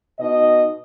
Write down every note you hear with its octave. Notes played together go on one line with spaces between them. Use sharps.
B2 D#4 D#5